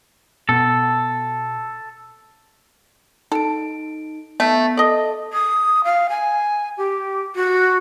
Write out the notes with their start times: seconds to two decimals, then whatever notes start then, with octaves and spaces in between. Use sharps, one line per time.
0.49 B2 A4
3.32 D#4 A4 D7
4.40 A3 B3
4.77 A4 D5 D#5 A5
5.33 D#6
5.84 F5
6.09 G#5
6.78 G4
7.35 F#4